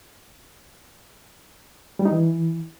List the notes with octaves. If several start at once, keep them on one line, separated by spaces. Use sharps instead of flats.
G3
D#4
E3